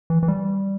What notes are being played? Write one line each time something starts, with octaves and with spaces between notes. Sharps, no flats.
E3
E3
G3